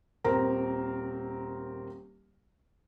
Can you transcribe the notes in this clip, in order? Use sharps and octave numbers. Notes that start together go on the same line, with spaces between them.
D#1 C4 A#4 A#5